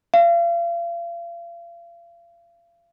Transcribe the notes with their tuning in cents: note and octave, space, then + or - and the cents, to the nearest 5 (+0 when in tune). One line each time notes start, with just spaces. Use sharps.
F5 -35